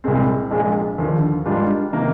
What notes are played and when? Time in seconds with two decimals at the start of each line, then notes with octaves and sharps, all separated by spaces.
0.04 C2 A#2 G#3 C4
0.51 A#1 A#2 F3 G#3
0.98 D#2 D3 F3
1.45 G#2 G3 D4 F4 A#4
1.92 C3 D#3 A#3 D#4 A#4